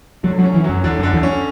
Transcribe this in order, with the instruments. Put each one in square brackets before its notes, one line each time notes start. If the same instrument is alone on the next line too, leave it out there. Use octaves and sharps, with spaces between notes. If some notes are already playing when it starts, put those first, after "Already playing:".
[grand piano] D3 [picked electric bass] F#3
[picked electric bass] F#3
[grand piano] C#4
[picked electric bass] E3
[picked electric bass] F#2 [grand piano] F#3
[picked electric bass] E2 [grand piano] D3
[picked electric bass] F#2
[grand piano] D3
[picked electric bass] E2
[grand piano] C#4